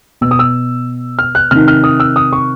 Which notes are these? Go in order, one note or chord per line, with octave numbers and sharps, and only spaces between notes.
B2 E6
D#6
E6
F6
F#6
C3 D#3 F6
F6
D#6
E6
D#6
C#6